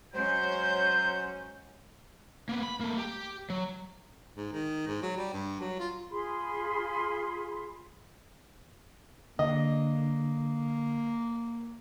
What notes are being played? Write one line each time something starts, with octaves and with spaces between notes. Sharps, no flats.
F#3 G#3 C#4 C5 G6
A#3 B3
B5
A3 A#3
G4
F#3
G#2
D#3
G#2
F#3
G3
G2
F#3
F4
F4 G#4 B5 C6
D3 A#3 D#5